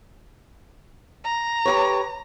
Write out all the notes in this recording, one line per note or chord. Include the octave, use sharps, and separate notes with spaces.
A#5
G4 B4 C#5